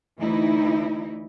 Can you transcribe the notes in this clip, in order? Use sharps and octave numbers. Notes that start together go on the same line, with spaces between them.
D2 E3 D#4 E4